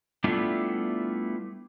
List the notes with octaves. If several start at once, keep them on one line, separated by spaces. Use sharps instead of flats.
G3 A3 B3 D4 E4 F4